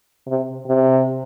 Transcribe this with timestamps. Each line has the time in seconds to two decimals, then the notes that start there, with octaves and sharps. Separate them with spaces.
0.27 C3
0.67 C3